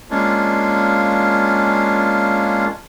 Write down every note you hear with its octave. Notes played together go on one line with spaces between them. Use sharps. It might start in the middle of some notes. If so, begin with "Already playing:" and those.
G#3 A#3 C#4 D4 F4